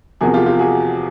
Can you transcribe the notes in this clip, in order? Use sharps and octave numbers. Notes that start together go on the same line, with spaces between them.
E2 C3 F3 A#3 F#4 G#4
F4 G4
F4 G4
F#4 G#4